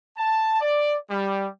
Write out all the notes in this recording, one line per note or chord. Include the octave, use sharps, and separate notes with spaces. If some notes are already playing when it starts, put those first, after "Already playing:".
A5
D5
G3